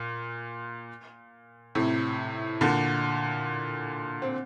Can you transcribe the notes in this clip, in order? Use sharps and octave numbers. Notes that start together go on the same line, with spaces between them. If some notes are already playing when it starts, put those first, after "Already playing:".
Already playing: A#2
A2 C3
A#2 D3
C4